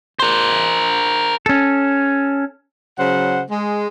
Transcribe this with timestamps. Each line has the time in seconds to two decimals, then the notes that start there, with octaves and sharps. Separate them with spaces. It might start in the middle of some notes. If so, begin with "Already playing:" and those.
0.19 A#4 C5
1.46 C#4 A4
2.99 C#3 F#3 C5 F#5
3.50 G#3